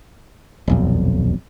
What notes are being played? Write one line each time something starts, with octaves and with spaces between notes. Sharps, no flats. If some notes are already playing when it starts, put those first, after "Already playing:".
D#1 B1 F2